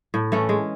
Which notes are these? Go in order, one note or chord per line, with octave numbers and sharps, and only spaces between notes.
A2
E3 A3 C#4
G#3